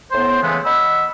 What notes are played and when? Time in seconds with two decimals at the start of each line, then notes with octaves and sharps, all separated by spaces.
0.11 A2 B3 C5
0.42 C#3 E3 G#3 A3 B3
0.65 D#5 F#5 B5 E6